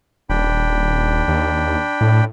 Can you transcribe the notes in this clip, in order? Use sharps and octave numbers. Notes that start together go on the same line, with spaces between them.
D#1 D4 G5 B5
D#2
A2